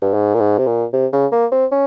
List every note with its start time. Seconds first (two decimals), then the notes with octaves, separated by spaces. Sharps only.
0.02 G2
0.13 G#2
0.34 A#2
0.40 G#2
0.58 C3
0.67 A#2
0.93 C3
1.13 C#3
1.32 A#3
1.52 C4
1.72 C#4